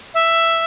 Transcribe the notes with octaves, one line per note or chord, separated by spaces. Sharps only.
E5